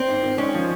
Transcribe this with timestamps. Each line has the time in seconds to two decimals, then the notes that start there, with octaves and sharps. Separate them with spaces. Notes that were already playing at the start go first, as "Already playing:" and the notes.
Already playing: C4
0.08 G#2
0.23 D#3
0.38 G#3 C#4
0.54 F3